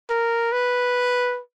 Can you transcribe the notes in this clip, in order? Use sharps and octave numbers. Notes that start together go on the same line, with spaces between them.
A#4
B4